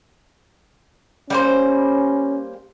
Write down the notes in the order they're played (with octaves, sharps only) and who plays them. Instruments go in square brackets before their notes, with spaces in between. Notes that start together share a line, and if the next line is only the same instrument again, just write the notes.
[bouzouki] G3 A#3 C5 [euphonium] C#4